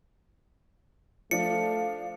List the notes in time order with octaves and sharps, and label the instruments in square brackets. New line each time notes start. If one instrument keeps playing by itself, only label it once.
[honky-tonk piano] F3 D4 [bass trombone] A3 [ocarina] F5 [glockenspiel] C#7